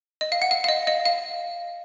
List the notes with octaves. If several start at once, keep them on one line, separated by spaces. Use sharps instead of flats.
D#5
F5
F#5
F5
F5
D#5
D#5
F5